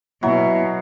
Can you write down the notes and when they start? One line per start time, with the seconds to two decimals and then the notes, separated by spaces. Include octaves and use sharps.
0.23 B2 F#3 E4